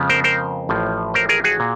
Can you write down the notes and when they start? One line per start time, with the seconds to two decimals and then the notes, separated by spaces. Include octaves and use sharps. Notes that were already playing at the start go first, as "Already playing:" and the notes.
Already playing: F2 C#3 F3 G#3 B3
0.10 A#4 C5
0.24 A#4 C5
0.69 A1 A2 F3
1.14 A#4 C5
1.29 G#4 A#4
1.44 F#4 G#4
1.60 A#2